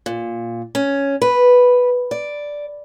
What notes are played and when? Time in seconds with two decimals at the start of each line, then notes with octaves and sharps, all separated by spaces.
0.06 A#2
0.75 C#4
1.22 B4
2.11 D5